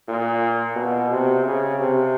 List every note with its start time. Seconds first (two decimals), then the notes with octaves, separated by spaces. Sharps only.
0.08 A#2
0.76 B2
1.11 C3
1.45 C#3
1.79 C3